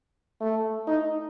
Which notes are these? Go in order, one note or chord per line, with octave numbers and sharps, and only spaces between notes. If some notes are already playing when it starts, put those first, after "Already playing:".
A3
D#4